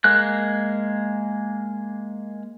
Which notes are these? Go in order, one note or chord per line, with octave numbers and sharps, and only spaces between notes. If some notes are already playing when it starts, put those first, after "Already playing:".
G#3 A#3 F#6